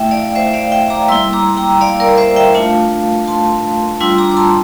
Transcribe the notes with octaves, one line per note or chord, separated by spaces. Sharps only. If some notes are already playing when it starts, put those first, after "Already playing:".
Already playing: A3 E4 E5 G5
D5 F5
C5 E5
E5
D5 F5
E5 G5
A#5 D6
G3 A#3 E4 C6 E6
A#5 D6
G5 A#5
D5 F5
A#4 D5
C5 E5
E5 G5
A3 D4 F4 F5 A5
A5 C6
G3 D4 F4 C6 E6
A#5 D6
D6
A5 C6